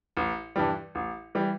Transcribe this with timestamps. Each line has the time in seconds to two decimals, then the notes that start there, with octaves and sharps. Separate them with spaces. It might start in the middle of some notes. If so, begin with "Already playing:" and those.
0.17 A1
0.56 G2 E3 G3
0.95 A1
1.35 E3 G3